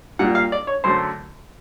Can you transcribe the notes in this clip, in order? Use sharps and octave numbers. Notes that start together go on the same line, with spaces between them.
A#2 G3 A#3 F#5
F5
D5
C#5
F#2 D3 F#3 A3 C5